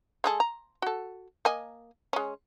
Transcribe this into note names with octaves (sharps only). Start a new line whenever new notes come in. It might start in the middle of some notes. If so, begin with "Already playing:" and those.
G#3 G#4 A4
A#5
F#4 A4
A#3 D#5 G#5
G#3 C#4